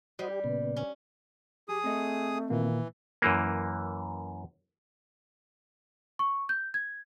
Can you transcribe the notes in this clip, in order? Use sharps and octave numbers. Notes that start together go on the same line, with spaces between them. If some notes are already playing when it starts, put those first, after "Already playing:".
G3 F#4 C5 D#5
G4
A#2 C#3 B3
C#4
F3 G4 G#4 D#6
A3 C4 D#5
A#2 D#3 E3 A#3
F#2 E3 A#3
C#6
G6
G#6